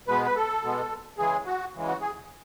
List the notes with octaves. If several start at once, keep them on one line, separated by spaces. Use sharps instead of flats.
B2 G#3 B3 B4
B4
A4
B2 G#3 B3
C#3 E3 G#3 G#4
F#4
C#3 E3 G#3
F#4
G#4